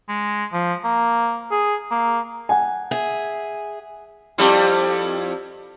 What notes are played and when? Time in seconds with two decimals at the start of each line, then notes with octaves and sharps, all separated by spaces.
0.08 G#3
0.53 F3
0.84 A#3
1.51 G#4
1.91 A#3
2.49 F#5 G#5
2.91 G#4 E5
4.38 F2 G3 E4